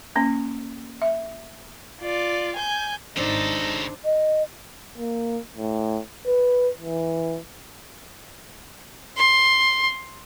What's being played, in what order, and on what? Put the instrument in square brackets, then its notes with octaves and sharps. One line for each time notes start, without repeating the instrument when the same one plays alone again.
[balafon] A#3 C#4
E5
[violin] F4 D5
G#5 G6
[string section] G#1 [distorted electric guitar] C#3 A4 [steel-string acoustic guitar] D4 C5 [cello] D#4
[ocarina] D#5
[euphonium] A#3
A2
B4
E3
[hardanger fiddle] C6